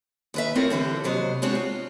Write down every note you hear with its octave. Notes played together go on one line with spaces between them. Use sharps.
D#2 B4 E5
A3 C4 E4 F4 A#4 C#5
D3 E3 G3 A4
D#2 C3 F#3 C5 D#5
G#3 B3 C4 D4 F#4 C#5
F4